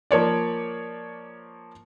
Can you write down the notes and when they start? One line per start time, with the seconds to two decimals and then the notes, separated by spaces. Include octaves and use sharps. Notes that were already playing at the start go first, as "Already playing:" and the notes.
0.11 F3 A#3 C#5 D5